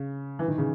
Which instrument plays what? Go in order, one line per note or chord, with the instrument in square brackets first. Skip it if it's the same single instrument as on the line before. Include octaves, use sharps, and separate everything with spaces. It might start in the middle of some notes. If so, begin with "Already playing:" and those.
Already playing: [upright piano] C#3
E3
D#3
C#3